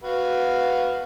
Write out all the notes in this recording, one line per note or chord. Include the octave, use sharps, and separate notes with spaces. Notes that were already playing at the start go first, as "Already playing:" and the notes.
F#4 B4 F5